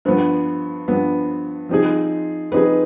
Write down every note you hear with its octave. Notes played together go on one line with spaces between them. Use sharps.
G2 F3 B3 C5
G2 F3 B3
F3 C4 D#4 G#4
F3 C4 D#4 G#4 B4